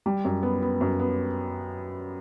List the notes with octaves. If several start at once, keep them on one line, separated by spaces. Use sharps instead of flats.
G3
F#2
B3
B3
F#2
B3